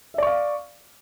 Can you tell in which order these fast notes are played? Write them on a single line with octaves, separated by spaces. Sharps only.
E5 D5 C#6 F5